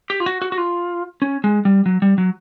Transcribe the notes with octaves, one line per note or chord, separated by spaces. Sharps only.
G4
F4
F#4
F#4
F#4
F4
C#4
G#3
G3
F#3
G3
F#3